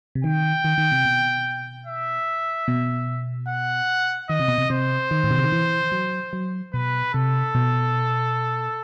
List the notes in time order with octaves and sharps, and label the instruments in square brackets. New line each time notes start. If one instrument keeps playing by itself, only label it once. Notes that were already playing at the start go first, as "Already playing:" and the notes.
[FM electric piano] C3
[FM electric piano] D#3 [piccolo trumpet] G5
[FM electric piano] D#3
D#3
C3
B2
[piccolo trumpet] E5
[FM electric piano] B2
[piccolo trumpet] F#5
[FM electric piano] D#3 [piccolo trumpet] D#5
[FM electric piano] C3
B2
C3
[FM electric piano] C3 [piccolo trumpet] C5
[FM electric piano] D#3
A2
B2
C3
D#3
E3
F#3
F#3
[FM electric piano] B2 [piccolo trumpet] B4
[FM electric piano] C3 [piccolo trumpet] A4
[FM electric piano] B2